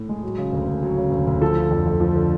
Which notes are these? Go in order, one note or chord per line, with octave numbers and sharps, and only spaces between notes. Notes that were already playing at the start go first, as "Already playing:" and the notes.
Already playing: A2
G#3
F#3
C#3
D2
D2
F#3
C#3
D2
D2
F3 A4
D3
F2
F2
F3
D3